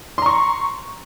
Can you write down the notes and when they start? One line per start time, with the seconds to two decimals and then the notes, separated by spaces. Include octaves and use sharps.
0.18 C6
0.22 A#5
0.26 C#6